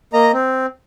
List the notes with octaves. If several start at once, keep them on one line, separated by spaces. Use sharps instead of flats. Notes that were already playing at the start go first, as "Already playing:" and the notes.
A#3 D#5 A#5
C4